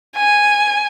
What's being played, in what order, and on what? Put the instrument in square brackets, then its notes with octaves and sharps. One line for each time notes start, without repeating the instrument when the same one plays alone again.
[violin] G#5